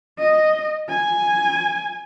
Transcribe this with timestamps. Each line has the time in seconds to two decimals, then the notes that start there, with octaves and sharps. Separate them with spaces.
0.19 D#5
0.89 G#5